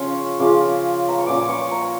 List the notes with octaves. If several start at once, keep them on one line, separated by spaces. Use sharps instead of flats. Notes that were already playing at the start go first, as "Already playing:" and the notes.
Already playing: C#3 F3 C#4 F4 C#6
C#3 F3 C#4 F4 D6
A#5
C#6
A#2 F3 C#4 D6
C#6
A#5